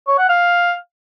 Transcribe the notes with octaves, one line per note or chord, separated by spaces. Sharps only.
C#5
F#5
F5